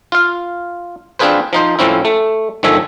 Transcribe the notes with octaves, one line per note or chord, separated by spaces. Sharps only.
F4 F5
C4 D4 F4 G#4 B4 C5
F3 D#4 C5
A2 F3 C4 C#4 E4
A3
G1 D#3 F3 A3 E5 G#5